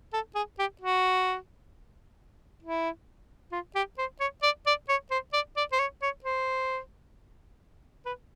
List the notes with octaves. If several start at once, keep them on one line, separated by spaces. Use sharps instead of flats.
A4
G#4
G4
F#4
E4
F4
G4
C5
C#5
D5
D5
C#5
C5
D5
D5
C5
C#5
C#5
C5
B4